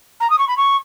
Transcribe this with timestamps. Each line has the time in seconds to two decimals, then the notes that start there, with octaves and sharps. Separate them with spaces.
0.20 A#5
0.30 D#6
0.38 C#6
0.48 B5
0.57 C#6